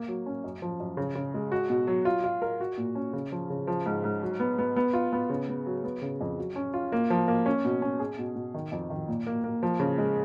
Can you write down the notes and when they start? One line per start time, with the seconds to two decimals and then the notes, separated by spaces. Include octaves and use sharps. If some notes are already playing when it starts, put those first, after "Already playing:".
Already playing: A#3
0.08 F#3
0.26 C#4
0.44 F#2
0.62 F3
0.80 F#2
0.97 C#3
1.15 C#3
1.34 G#3
1.52 F#4
1.70 B2
1.87 F#3
2.05 F4
2.24 F4
2.42 A#4
2.60 F#4
2.78 A#2
2.95 C#4
3.13 C#3
3.32 F3
3.50 C#3
3.67 F3
3.86 G#2
4.04 G#2
4.22 F#3
4.40 B3
4.59 B3
4.76 B3
4.93 F4
5.13 B3
5.30 C#3
5.49 B3
5.66 F#3
5.84 B3
6.02 C#3
6.21 F2
6.38 F#3
6.56 C#4
6.74 F4
6.92 A#3
7.10 F3
7.28 A#3
7.46 C#4
7.65 B2
7.82 C#4
8.00 G#4
8.19 B2
8.36 B2
8.54 D#3
8.72 F2
8.90 D#3
9.08 A#2
9.27 A#3
9.44 A#3
9.63 F3
9.80 C#3
9.98 G#3